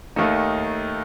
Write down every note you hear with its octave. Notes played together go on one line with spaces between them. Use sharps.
D#2 D#3 A3 D#4